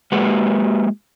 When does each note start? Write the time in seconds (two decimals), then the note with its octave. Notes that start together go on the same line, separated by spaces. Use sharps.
0.12 G#3 A#3 F#4 G4 B4 F#5